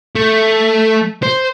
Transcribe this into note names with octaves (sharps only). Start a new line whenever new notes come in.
A3
C5